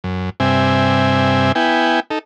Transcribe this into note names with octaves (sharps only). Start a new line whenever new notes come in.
F#2
G2 C3 C4 E5 G#5
B3 E4 G5 G#5
D#4 A4